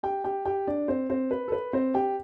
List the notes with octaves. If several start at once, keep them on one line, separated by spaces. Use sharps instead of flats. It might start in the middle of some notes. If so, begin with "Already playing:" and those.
G4 G5
G4 G5
G4 G5
D4 D5
C4 C5
C4 C5
B4
A4
B4
C4 C5
G4 G5